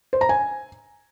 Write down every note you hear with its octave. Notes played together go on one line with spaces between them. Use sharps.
C5
A#5
G#5